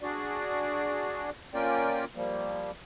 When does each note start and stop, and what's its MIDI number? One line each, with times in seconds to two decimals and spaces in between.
0.02 1.30 62
0.02 1.30 66
0.02 1.30 68
0.02 1.30 74
1.54 2.05 58
1.54 2.05 61
1.54 2.05 65
1.54 2.05 70
1.54 2.05 74
1.54 2.05 79
2.15 2.71 53
2.15 2.71 55
2.15 2.71 58